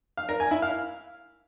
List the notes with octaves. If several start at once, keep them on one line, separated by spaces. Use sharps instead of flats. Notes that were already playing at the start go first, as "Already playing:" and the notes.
F5
A#4
G#5
E4
F5